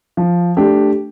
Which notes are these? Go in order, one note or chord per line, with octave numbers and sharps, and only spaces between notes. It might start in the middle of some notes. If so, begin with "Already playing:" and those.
F3
A3 D4 G4